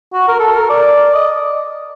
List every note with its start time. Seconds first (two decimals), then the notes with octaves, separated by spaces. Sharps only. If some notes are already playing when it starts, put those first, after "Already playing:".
0.14 F#4
0.28 A#4
0.40 A4
0.55 A#4
0.70 D5
1.14 D#5